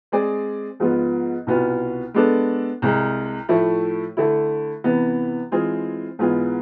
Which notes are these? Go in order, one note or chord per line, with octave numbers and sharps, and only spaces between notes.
G#3 C4 G#4 D5
G#2 F3 B3 F4
C2 B2 B3 F4
G#3 B3 D4 A4
C2 C3 G#3
A2 F3 A3 E4
D3 A3 E4
C3 E3 B3
E3 G#3 C4 F4 G#4
G#2 E3 B3 F4 G#4